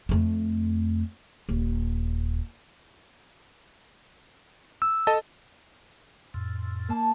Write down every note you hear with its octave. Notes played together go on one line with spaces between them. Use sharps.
F2 A3
D#1
E6
A4 D#5 A5
F2 A2
A#3 A5